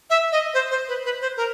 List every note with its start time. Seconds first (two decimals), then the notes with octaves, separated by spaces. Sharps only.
0.10 E5
0.32 D#5
0.54 C5
0.71 C5
0.88 B4
1.05 B4
1.21 C5
1.37 A#4